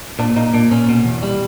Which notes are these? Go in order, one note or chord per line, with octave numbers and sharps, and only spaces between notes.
A#2 D4
A#2 D#4
A#2 D4
A#2 C#4
B2
E2
G3